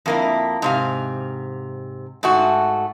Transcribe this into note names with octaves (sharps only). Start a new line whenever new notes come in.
F2 A#3 E4
G#2 C3 F5
G#2 A3 F#4